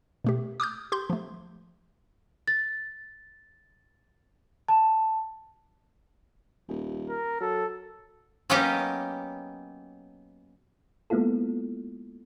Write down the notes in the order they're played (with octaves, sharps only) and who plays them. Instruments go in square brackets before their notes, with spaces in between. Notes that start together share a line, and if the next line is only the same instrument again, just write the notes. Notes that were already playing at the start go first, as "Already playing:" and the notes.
[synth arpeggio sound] B2 A3 G4
D6 D#6 F6 G6
G4 C6 G6
F3 A3
[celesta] A6
A5
[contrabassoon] D#1
[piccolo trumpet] A#4
[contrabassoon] F#3 [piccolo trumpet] A4
[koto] F#3 A#3 B3 C#4 D#4 G4
[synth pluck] G#3 A#3 B3 E4 F4 A4